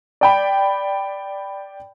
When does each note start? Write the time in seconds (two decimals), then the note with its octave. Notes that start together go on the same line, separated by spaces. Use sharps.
0.21 D5 G5 B5